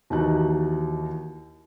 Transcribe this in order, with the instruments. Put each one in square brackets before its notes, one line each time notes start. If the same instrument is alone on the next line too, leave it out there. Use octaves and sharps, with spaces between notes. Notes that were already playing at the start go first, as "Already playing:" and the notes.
[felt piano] D#2 E3 D#4 F#4 A5 F#6